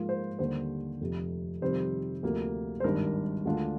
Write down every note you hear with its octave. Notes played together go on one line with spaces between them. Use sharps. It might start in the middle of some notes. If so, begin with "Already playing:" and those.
Already playing: G#2 F3 A#3 F4
C5
D#2 D3 G3 C5
F1 F2 C3
F2 C3 D#3 G3 C4 C5
D2 C3 F3 A#3
C5
G#1 G2 D#3 G3 D4 A#4
D2 D3 G#3 D4 F4